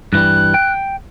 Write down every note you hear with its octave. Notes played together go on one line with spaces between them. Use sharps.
G2 E3 G3 F#6
G5